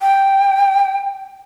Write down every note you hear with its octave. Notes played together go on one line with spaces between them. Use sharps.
G5